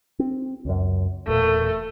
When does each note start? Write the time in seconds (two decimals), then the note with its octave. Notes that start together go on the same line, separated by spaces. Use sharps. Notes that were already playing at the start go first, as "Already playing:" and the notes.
0.19 C4
0.65 C#2 F#2
1.28 E1 A#2 A3